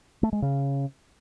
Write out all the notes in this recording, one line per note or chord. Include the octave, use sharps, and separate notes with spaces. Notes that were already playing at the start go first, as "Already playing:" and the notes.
A3
G#3
C#3